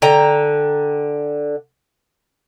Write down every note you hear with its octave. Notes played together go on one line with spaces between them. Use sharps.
D3 G5 A#5